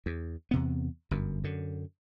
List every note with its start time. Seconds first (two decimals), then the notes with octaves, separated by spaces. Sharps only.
0.06 E2
0.51 E2 C3 B3
1.11 G1 F#2
1.44 F#2 D3